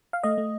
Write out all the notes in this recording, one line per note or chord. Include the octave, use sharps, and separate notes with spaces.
F5
A3 D#5
A3